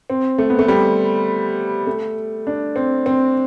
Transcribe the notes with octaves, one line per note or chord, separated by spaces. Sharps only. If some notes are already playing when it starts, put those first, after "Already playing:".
C4
A3
B3
A3
G3
A3
D4
C4
C4